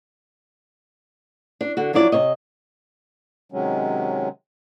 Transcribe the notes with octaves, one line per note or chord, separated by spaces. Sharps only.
D4
D3 F#4
F3 F#3 D4 E4 D5
C3 C#5 D#5
C3 D#3 F#3 G#3 C#4